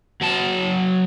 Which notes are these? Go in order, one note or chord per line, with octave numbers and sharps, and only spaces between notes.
F#3 A5